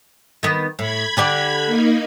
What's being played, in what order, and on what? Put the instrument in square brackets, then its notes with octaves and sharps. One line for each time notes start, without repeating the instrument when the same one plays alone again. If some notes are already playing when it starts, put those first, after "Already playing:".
[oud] D#3 B3
[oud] A2 [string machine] B5 G#6
[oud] D3 G4 D5
[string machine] A#3 D#4